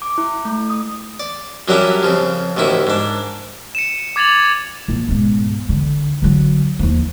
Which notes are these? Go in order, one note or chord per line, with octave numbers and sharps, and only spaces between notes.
D6
E4
A3
D#6
D5
F#2 F#3 G3 C#4 D4 E4
F2 C#3 F3
A1 D2 D#3 E4
G#2 D4
C#7 D#7 E7
D6 G#6 A6 F7 F#7
A#1
G#2 B2
D3
D3 F#3
D#2 F3